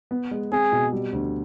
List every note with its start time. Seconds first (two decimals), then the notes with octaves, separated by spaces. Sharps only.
0.11 B3
0.31 G#3
0.52 C4 G#4
0.72 B2
0.93 G3
1.13 D2